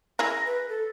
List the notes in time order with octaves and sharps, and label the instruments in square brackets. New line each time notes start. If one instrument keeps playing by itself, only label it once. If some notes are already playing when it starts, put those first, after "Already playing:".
[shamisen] E4 G#4 A#4 [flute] A#6
[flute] B4
A4